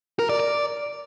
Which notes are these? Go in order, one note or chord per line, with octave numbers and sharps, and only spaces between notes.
A#4
D5
D5